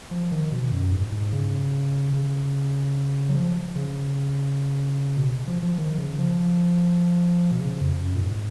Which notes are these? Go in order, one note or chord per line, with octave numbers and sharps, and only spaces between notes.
F3
D#3
B2
F#2
G#2
G#2
C#3
C#3
F#3
F3
C#3
B2
F3
F3
D#3
C#3
F3
B2
C#3
F2
F#2
A#2
G#2